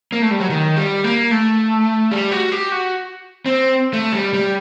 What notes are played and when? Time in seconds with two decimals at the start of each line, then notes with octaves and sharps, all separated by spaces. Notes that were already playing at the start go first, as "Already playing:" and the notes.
0.12 A#3
0.22 A3
0.31 G3
0.40 F#3
0.50 D#3
0.76 G3
1.04 A#3
1.31 A3
2.11 G3
2.32 F#4
2.52 G4
2.72 F#4
3.46 C4
3.93 A3
4.13 G3
4.34 G3